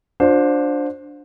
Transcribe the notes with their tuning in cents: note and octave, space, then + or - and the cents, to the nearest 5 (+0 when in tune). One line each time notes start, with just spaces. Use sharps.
D4 +0 F4 +40 C5 +5